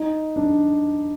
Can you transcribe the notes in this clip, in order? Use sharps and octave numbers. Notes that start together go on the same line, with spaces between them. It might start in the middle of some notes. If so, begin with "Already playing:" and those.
Already playing: D#4
D4